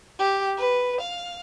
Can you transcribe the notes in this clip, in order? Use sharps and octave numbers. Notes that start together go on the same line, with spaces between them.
G4
B4
F5